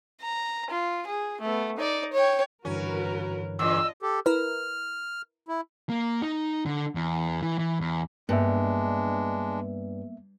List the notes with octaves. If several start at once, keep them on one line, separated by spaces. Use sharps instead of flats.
A#5
F4
G#4
A3 B3
D#4 D5
C#5 G5
G2 D3 E3 C#4 F#4 A#4 B4
E2 A#2 D4 F4 D#5 E6
G4 A4
E4 A#4 B4 F6
E4
A#3
D#4
D3
E2
E3
E3
E2
G2 G#3 A#3 B3 D4 E5